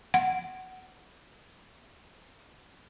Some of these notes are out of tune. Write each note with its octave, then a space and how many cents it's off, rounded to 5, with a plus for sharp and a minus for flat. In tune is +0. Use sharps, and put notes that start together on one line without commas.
F#5 +15